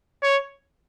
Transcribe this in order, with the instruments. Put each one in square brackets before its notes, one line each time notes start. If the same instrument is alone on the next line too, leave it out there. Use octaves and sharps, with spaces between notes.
[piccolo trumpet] C#5